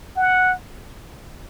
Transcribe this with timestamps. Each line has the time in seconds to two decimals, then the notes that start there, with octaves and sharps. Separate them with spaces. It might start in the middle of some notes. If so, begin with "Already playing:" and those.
0.17 F#5